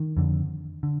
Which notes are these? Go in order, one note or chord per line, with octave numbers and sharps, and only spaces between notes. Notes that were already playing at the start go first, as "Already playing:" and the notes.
Already playing: D#3
F2 D3
D3